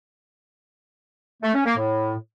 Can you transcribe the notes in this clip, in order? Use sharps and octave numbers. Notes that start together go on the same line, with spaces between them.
A3
C#4
A#3
A2